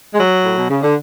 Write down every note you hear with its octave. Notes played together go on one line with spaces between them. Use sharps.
G#3
F#3
A2
B2
C#3
D3